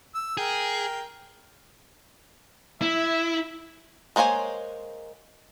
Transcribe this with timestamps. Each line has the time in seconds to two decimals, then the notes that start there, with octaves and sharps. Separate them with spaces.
0.15 E6
0.37 G#4 A#4 G5
2.82 E4 E5
4.16 G#3 A#3 C5 C#5 G#5